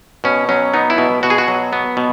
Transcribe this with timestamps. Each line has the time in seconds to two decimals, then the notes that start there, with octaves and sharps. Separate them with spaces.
0.24 B2 C#4
0.49 F#3 C#4
0.74 B3 D#4
0.90 E4
0.98 B2
1.23 B2 F#4
1.30 G#4
1.38 F#4
1.48 F#3
1.73 B3
1.97 B2